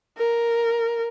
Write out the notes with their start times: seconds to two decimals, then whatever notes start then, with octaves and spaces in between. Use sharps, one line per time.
0.18 A#4